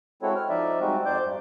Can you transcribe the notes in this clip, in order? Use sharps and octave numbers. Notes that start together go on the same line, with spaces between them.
G#3 C4 E4 F#4 A4 C#5
F6
F3 D#4 D5 E5
G3 G#3 C4 D#4 F#4
F2 C5 D5 D6 G6
G2